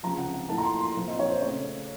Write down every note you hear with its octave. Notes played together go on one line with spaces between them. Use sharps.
C#2 C3 F3 A#5
F#5
F#5
A2 F3 A#3 D#4 A5
A#5
C6
C6
A#2 F3 C4
D#5
C#5
C5
C#3 A3 C#4 C#5